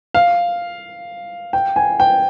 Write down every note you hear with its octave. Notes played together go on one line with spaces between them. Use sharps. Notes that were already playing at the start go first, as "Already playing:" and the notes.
F5
G5
G#5
G5